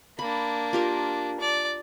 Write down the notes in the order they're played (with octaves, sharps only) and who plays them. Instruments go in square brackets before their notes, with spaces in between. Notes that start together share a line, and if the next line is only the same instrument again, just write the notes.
[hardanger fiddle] A#3 D4 [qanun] B5
[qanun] F4 G4 A#4
[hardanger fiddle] D5